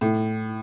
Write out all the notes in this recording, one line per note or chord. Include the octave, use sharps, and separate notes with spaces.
A2